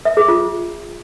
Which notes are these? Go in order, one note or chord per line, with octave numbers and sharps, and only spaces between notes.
E5
G#4
F4